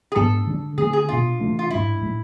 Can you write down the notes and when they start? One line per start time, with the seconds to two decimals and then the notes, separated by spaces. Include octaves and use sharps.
0.12 G#4
0.15 G#2 G#3 B3 D4 A4
0.47 D3 G#3 B3 D4
0.78 D3 A3 C4 G#4
0.93 G#4
1.09 B2 B3 D4 F4
1.40 C3 E3 A3 D4
1.59 F4
1.70 G#2 G#3 D4 E4
2.01 A2 G#3 D4